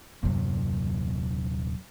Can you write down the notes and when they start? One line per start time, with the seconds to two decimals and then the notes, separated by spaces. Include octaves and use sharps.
0.23 D#1 F#2 C3 F#3 A#3